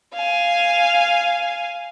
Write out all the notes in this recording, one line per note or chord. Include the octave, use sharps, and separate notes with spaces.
F5 G#5